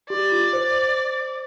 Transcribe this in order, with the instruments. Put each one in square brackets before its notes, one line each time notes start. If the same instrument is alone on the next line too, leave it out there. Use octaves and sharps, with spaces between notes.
[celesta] G4 [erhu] D5
[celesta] F4
C5